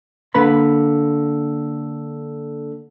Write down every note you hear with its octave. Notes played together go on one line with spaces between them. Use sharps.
D3 A#3 B4 A#5 B5